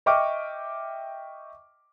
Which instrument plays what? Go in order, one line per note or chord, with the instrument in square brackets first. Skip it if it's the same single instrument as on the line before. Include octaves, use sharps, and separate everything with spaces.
[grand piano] D#5 E5 G5 C#6 D6 F6